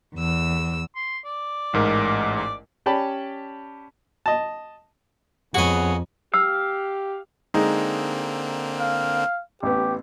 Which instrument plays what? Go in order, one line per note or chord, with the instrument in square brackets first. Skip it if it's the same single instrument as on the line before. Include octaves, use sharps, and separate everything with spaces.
[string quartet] E2 E6
[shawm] C6
D5
[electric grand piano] A1 G#2 A#4
[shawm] D5
[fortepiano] C#4 G4 D5 G5 A5 B5
D#5 A5
[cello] F2 [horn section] B3 G#4 C#5 [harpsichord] F#4 D#5
[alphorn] G4 [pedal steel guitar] F5 [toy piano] E6
[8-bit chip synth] D3 A#3 C4 [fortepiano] G#3 D#4
[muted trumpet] F5
[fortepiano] A1 B3 [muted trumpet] G4